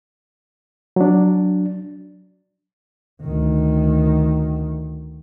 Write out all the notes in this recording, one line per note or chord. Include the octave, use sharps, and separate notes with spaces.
F#3 D4
D2 D#3